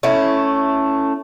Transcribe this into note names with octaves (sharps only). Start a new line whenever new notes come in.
A3 C#4 E4